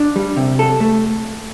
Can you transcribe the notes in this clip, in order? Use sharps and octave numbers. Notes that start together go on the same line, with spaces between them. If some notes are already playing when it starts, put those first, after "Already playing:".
Already playing: D4
G3
C3
A4
A3